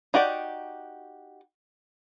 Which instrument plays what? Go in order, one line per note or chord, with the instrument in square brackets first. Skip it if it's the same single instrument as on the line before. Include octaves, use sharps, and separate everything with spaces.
[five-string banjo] D#4 F#4 G4 D5